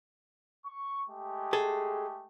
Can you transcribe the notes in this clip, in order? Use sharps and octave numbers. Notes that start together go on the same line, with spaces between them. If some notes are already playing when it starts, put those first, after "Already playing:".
C#6
G#3 A3 G4
G#4 A4